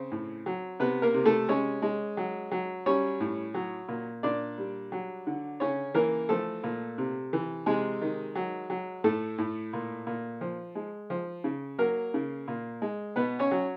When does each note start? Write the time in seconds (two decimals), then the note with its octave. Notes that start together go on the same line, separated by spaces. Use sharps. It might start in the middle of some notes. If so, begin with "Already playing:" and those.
Already playing: C#3 C4
0.11 A2
0.46 F#3
0.80 C3 B3 B4
1.02 A#3 A#4
1.14 C3
1.26 A3 A4
1.49 G#3 C#4 C#5
1.82 G#3
2.17 F#3
2.51 F#3
2.86 G3 C#4 C#5
3.20 A2
3.54 F#3
3.88 A#2
4.23 A#2 D4 D5
4.58 G3
4.92 F#3
5.27 D3
5.60 C#3 C#4 C#5
5.94 E3 A#3 A#4
6.29 F3 A3 A4
6.64 A#2
6.98 C3
7.33 E3
7.66 C3 G#3 G#4
8.02 D#3
8.35 F#3
8.70 F#3
9.04 A2 A3 A4
9.38 A2
9.73 A#2
10.07 A#2
10.41 F3
10.75 G#3
11.10 F3
11.44 C#3
11.78 F#3 A#3 A#4
12.14 C#3
12.48 A#2
12.82 G#3
13.16 B2 B3 B4
13.39 C#4 C#5
13.51 F#3